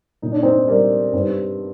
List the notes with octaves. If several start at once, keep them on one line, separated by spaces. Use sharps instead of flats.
A#2 D#4
D4
C4 D#4
G3 A#4 D5
G2 C4 D#4